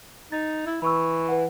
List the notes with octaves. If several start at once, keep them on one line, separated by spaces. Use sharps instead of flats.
D#4 A6
E4
E3 B5 C#6 E6
B4 F#5